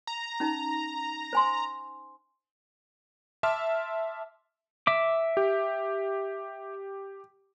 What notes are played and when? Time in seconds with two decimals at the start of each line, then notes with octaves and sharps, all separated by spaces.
0.07 A#5
0.40 C#4 D#4
1.33 C5 G#5 C6
3.43 E5 A5 C6 D6 E6 F6
4.87 E5 D6
5.37 G4